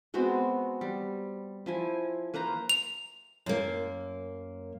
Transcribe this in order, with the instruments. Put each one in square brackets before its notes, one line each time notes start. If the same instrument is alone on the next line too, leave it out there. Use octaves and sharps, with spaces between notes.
[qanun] G#3 B3 C4 F#4
G3
F3 E4 G#5
A#3 B4 C5 A#5
[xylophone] F7
[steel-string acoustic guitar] F#2 A#3